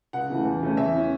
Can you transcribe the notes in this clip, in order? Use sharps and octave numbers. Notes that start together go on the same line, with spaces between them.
C#2 F#5
C#3 E3 A3
E2
C#3 A3 C#4
E2 E5
E3 C#4